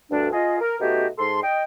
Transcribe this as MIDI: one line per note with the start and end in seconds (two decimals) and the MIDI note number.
0.11 0.32 38
0.11 0.32 43
0.11 0.32 62
0.33 0.60 65
0.33 0.60 68
0.33 0.60 75
0.60 0.77 70
0.80 1.07 47
0.80 1.07 57
0.80 1.07 59
0.80 1.07 63
0.80 1.07 66
0.80 1.07 67
1.18 1.40 44
1.18 1.40 69
1.18 1.40 84
1.43 1.64 75
1.43 1.64 79